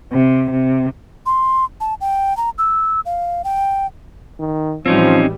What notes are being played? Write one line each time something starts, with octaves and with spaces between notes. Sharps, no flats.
C3
C3
C6
A5
G5
A#5
E6
F5
G5
D#3
A1 E3 F3 G3 C4 C#4 D#4